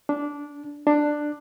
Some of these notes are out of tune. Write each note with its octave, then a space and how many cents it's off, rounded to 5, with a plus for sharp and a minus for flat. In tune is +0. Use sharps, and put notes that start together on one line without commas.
D4 -15
D4 +10